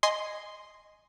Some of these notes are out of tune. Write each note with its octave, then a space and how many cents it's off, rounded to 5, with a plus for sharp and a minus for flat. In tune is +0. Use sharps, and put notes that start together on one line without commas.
D#5 +0 G#5 +0 C6 -5